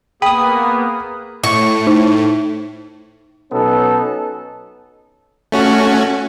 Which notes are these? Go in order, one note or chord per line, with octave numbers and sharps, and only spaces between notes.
A#3 B3 G#4 G5 B5 D#6
A2 C#6
D#4
B2 F#3 B3 C#4 D#4 A4
A3 C#4 F#4